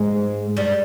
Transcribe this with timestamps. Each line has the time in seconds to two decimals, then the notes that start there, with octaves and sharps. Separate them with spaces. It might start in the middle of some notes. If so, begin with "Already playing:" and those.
Already playing: G#2 G#3
0.57 G2 G3